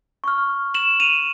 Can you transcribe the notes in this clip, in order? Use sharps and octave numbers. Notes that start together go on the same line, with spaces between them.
C#6 F6
E7 F#7
D#7 F7